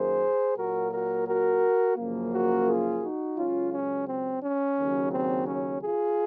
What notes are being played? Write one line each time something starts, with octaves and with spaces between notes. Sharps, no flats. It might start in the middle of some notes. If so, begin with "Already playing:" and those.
Already playing: F#2 D#3 A#3 G#4 C5
A#2 F#3 A#3 F#4 A#4
F#4 A#4
F#4 A#4
F#2 C#3 F3 A#3
F#4 A#4
F4 G#4
D#4 F#4
C#2 C#3 F#3 C#4 F4
C#4
C4
C#4
D#2 C#3 F#3
C4
C#4
F4 G#4